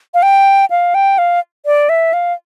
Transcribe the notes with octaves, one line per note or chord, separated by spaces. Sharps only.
F5
G5
F5
G5
F5
D5
E5
F5